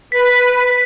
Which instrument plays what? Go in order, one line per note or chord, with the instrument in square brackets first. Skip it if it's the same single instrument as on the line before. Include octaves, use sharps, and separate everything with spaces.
[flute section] B4 [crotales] B6